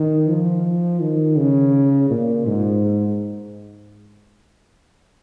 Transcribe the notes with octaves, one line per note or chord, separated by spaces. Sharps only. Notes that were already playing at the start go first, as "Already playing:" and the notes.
Already playing: D#3
F3
D#3
C#3
A#2
G#2